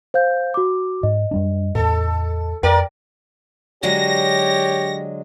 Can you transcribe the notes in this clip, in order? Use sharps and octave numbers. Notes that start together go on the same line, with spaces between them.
C5 F5 G6
F#4 D6
G#2 D#5
F#2 G3 D4
E2 A2 A4
F2 A#4 D5 G5
D3 F#3 G#3 G4 C#5 A#6